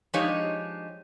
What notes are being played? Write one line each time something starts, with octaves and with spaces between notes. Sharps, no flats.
F3 G#3 D4 D#4 G4 C#5